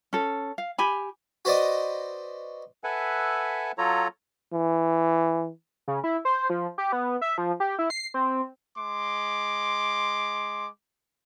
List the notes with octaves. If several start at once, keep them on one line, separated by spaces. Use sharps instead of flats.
C#4 A4
F5
G4 G#5 B5
F#4 B4 C5 D5 D#5
A4 B4 E5 F#5 G#5
F#3 F4 A4 C#5 A#5
E3
C#3
E4
C5
F3
G4
B3
E5
F3
G4
E4
C7
C4
G#3 C6 D6